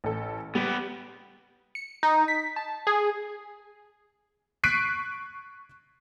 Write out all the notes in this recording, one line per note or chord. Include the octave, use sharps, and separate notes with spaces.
A1 A4
G3 B3 G4
C#7
D#4
B6
A5
G#4
C#6 F#6 B6 C7 D7 D#7